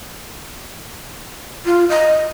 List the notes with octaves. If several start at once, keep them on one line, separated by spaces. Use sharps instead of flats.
F4
D#5